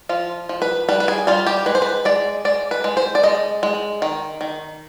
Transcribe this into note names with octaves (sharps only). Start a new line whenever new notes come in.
F3 F4
F3
B4
G3 B4
B4
G#4
G3 F4
G4
G#3 B4
C5
B4
G#3 D5
G#3 D5
B4
G#3
C5
D5
G#3 D#5
G#3
D#3
D#3